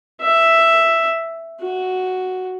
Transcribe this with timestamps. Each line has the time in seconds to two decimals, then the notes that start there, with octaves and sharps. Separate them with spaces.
0.22 E5
1.61 F#4